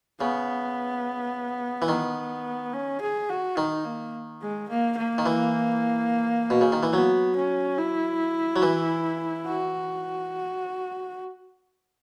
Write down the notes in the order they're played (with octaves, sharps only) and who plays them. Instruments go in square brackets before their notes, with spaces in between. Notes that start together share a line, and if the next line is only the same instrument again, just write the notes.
[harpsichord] C#3 [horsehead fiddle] B3
[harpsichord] E3
[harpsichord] D#3 [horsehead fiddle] B3
[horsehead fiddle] C#4
G#4
F#4
[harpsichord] D#3 [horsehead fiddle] D#4
[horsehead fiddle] A#3
G#3
A#3
A#3
[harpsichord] D#3
E3
B2
C#3
D#3
E3
[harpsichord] F#3 [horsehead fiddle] B3
[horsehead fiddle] C#4
E4
[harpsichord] F#3
E3
[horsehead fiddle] F#4